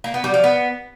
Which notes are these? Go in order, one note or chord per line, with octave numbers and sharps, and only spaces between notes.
A#3
B3
G3
F3
B3